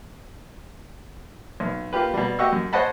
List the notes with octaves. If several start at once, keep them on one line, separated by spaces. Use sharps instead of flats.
B1
A#3 F4 G4 B4
B2 G3
F#4 G4 D#5 F#5 C#6 E6
F#2
C5 C#5 D#5 F#5 A5 B5